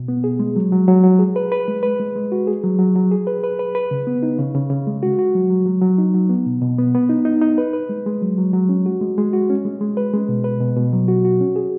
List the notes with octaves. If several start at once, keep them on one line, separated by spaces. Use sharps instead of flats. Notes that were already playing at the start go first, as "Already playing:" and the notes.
Already playing: B2
B3
G#4
G#3
F#3
F#3
F#3
F#3
G#4
B4
B4
G#3
B4
G#3
G#3
F#4
G#4
F#3
F#3
F#3
G#4
B4
B4
B4
B4
C#3
B3
D#4
C#3
C#3
C#3
G#3
F#4
F#4
F#3
F#3
F#3
F#3
D#4
F#3
B3
B2
B2
B3
B3
D#4
D#4
D#4
B4
B4
G#3
G#3
F#3
F#3
F#3
C#4
F#4
G#3
G#3
F#4
C#4
G#3
G#3
B4
G#3
B2
B4
B2
B2
F#3
F#4
F#4
C#4
G#4